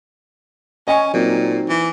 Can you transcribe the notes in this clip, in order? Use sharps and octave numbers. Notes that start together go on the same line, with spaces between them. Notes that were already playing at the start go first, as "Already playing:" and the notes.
C#4 D#5 G#5 C#6
A#2 F#3 C4 D#4
E3